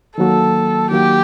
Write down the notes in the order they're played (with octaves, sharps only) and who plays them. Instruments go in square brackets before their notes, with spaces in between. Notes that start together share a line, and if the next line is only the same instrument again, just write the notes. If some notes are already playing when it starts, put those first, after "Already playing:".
[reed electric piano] D#3 F#3 A#3 F#4 [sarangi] A4
[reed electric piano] D#3 F#3 A#3 F#4 [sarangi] G4